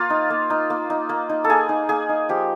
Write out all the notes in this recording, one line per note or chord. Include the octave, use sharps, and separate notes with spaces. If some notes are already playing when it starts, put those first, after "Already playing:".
Already playing: A#3 F4
D#4
A#3
D#4
A#3
D#4
A#3
D#4
A4
A#3 G#4
D#4
A#3 G#4
D#4
F3 G4